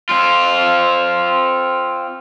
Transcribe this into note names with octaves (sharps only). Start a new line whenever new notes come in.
C4 F4